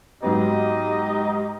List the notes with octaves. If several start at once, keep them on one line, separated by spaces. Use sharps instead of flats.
G#2 F#3 B3 D#4 G4 D#5